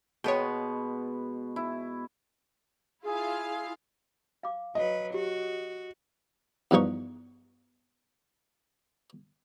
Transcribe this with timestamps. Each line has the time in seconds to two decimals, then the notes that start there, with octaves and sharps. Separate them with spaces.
0.24 B2 G#3 B3 C#5 G5
1.56 E4
3.04 E4 F4 G#4 F5
4.43 F5 D6
4.75 F#3 B4 D#5
5.14 F#4 G4
6.71 E2 G2 F3 D#4 C#6